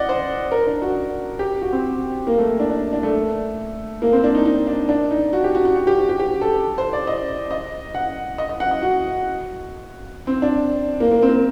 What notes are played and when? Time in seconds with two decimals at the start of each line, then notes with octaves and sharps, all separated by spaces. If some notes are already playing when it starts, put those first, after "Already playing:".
Already playing: D5 D#5 F#5
0.09 C5
0.52 A#4
0.67 D4
0.82 F#4
1.39 G4
1.61 F#4
1.73 C4
2.27 A#3
2.38 A3
2.60 D4
2.70 D4
2.93 D4
3.03 A3
4.02 A#3
4.13 C4
4.24 D4
4.35 D#4
4.45 D#4
4.67 D4
4.89 D4
5.11 D#4
5.33 F#4
5.44 G4
5.55 F#4
5.65 F#4
5.76 F#4
5.87 G4
5.98 F#4
6.09 G4
6.19 G4
6.41 A4
6.78 C5
6.93 D5
7.07 D#5
7.51 D#5
7.95 F#5
8.38 D#5
8.49 D#5
8.60 F#5
8.71 D#5
8.82 F#4
10.27 C4
10.42 D4
11.00 A#3
11.11 A#3
11.22 C4
11.29 A#3
11.33 C4